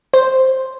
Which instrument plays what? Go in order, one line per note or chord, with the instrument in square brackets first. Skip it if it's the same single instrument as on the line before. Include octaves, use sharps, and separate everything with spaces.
[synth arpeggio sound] C5